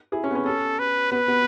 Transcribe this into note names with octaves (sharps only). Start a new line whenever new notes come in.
E4 G#4
C#4
B3
C#4
C#4 A4
B4
B3 B4
B3